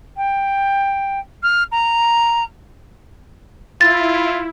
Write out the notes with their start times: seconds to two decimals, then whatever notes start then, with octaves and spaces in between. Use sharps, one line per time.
0.16 G5
1.42 F6
1.71 A#5
3.81 E4 F4 A6